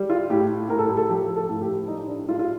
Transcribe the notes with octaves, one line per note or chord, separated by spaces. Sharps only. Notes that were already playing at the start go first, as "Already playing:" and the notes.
Already playing: G3
F4
A2 G4
A2 A#4
A4
G4
A4
F3 G4
A4
A2
G4
G3 D#4
D4
G3 F4
F4